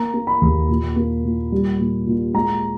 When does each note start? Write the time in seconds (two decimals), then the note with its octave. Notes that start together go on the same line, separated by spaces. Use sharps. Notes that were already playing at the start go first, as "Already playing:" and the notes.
Already playing: A#3 A#5
0.14 A#3
0.27 B5
0.41 D#2
0.69 A#2
0.96 A#3
1.24 A#2
1.52 G3
1.79 A#2
2.07 A#2
2.34 G#3 A#5